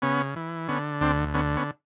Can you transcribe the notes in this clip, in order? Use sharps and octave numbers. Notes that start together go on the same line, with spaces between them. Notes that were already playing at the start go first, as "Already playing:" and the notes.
C#3 B3 C#4
E3
D3 B3 C#4
D2 C4 D4
D3 B3 C#4
B3 C#4